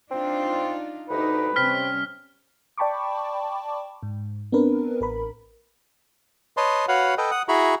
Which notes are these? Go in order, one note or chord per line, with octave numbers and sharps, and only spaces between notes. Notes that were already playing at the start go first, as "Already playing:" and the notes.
C4 D4 D#4 F4
D2 D#4 G4 B4
C3 G3 C4 C#4 F6 B6
D5 G5 A5 B5 C#6 D6
G#2
B3 C4 D4 A#4 B4
A1 A#4 B5
B4 C#5 D#5 A5 C6
F#4 B4 C#5 F5 F#5
A4 B4 D#5 G5
F#5 D#6
E4 F#4 G#4 A#5 B5 C#6